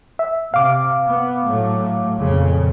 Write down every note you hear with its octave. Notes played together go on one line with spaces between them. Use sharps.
E5
C3 F5 D6
B3
A2 F#3 A3
F2 A#2 C#3